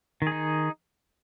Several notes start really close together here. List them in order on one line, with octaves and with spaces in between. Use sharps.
D#3 G#4 D#4